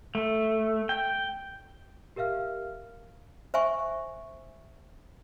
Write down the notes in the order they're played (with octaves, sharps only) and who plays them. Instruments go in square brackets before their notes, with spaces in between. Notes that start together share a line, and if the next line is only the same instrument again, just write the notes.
[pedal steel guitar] A3
G5
[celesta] G4 A#4 E5 F5 F6
[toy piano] C5 E5 G#5 C#6